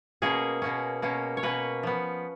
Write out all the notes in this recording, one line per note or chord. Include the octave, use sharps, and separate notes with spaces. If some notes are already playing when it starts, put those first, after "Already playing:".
B2 A#3 C#4 G#4
B2 A#3 C#4
B2 A#3 C#4
C#5
B2 A#3 C#4 B4
F3 B3